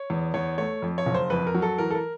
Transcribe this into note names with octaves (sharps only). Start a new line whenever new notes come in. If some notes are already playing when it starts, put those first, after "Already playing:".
Already playing: C#5
E2
E2 C#5
A3 C#5
F2
C#5
F#1
C5
F2 B4
A#4
F#3
A4
E3 A#4
A4
A#4